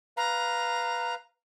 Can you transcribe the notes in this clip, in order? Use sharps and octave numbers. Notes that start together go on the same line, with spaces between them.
B4 F5 A#5